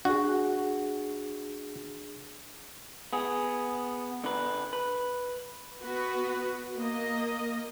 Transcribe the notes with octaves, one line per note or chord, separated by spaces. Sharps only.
D4 F#4 G#4
B3 G#4
D3 B4
B4
B3 F#4 B4
A#3 D#5